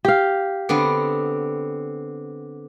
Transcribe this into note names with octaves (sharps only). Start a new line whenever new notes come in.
G4 F5
D3 B3 C4